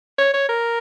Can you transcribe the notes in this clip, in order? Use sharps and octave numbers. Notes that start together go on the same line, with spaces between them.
C#5
C#5
A#4